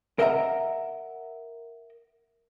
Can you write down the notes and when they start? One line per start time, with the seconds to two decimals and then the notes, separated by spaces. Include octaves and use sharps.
0.19 A#4 D#5 E5 F#5 G5 A#5